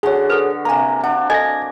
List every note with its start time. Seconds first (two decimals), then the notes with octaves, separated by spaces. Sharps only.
0.03 D3 F#4 G#4 C#5
0.30 A4 B4
0.65 C3 A#3 G#5 A#5
1.04 D4 F#5
1.30 A4 D#5 G#5 G#6 A#6